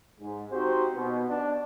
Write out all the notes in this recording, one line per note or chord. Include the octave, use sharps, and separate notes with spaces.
G#2
C4 D#4 F#4 G4 C5
B2
D4